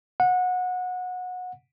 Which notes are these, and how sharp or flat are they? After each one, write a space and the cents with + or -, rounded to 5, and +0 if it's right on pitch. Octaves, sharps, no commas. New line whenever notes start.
F#5 -25